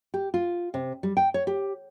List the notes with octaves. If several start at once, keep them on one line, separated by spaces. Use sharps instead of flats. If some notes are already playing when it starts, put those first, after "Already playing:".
G4
F4
C3
G3
G5
C#5
G4